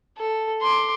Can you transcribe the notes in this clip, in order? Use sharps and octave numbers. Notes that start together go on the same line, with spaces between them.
A4
C6 D6